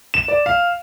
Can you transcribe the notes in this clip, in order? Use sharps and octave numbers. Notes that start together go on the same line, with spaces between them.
E7
D5
F5